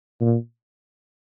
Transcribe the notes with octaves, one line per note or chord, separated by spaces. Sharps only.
A#2